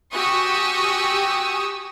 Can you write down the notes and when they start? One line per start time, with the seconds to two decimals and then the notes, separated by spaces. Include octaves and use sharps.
0.14 F#4 G4 G#5 C#6 D#6 E6